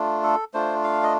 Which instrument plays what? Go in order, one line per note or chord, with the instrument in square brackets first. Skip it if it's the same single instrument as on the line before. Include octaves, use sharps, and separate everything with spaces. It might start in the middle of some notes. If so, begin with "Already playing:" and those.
Already playing: [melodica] A3 D4 F4
A4
A3 D4 F4 C5
F5
D#5